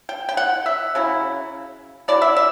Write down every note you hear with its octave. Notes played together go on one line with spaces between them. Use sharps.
G5
G5
F#5
E5
C#3 F#3 C#4 E4
F#3 A3 E4 D5
E5
E5